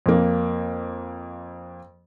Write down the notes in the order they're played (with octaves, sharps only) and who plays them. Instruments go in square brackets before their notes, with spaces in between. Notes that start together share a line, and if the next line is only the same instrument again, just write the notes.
[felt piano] F2 A#3